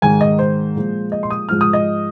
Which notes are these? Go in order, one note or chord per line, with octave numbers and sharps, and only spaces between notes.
G#2 D#3 G#3 G#5
D#5
C5
A#2 F3 G#3
D#5
C6
D#6
G#2 F3 G#3 F6
D#6
D#5